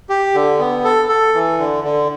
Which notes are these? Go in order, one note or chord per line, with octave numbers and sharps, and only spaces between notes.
G4
D3
B3
A4
A4
E3
D3
D3